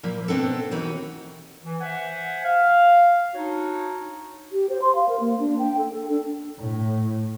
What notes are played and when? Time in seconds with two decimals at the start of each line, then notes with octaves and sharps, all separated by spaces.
0.03 A#2 F3 A#3 E4
0.28 B2 B3 C4 D4 A4
0.71 D#2 E3 D#4 E4 F#4 G4
1.65 E3
1.81 C5 E5 F#5 G#5
2.44 F5
3.34 D4 D#4 F#4 C#5
4.52 G4
4.70 C5
4.82 C6
4.95 F5
5.09 A#4
5.20 A#3
5.40 D4
5.59 G5
5.78 A4
5.93 A4
6.10 D4
6.59 A2